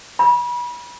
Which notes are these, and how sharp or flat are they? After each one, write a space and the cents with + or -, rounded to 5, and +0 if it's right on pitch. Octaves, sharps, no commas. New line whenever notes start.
B5 -30